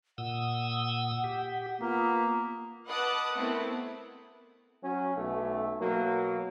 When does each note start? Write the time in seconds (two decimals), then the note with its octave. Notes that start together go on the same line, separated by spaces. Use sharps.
0.18 A#2 F#5 D#6 E6
1.24 G4
1.81 A#3 B3 F4
2.87 B4 D#5 F#5 A5 D6 D#6
3.36 A3 B3 C4 E4 A#4
4.83 F#3 C#4
5.16 B1 A3
5.80 B2 F#3 A#3